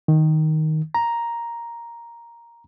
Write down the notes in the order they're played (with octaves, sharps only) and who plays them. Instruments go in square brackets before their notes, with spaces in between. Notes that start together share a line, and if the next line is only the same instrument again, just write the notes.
[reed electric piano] D#3
A#5